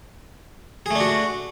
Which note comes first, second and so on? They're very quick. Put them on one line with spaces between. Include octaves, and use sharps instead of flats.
G#4 A3 D4 F#4